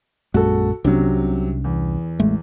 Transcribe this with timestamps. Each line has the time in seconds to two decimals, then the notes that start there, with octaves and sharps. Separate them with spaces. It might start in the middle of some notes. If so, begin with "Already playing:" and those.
0.34 A#1 F#2 G#3 F#4 A4
0.84 C2 C3 F#3 C#4 D4
1.64 E2
2.20 A1 G#3 A3